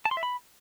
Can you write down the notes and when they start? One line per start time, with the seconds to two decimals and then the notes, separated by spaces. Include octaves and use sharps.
0.05 A5
0.11 C6
0.17 E5
0.23 B5